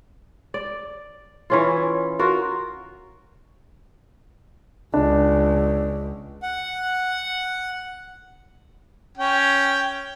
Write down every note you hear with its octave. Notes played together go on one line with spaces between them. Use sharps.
D5
E3 C#4 F4
F4 F#4 A#4
C#2 D4
F#5
C#4 G5